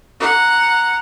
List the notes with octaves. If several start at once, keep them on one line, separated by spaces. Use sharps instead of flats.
F#5 A#5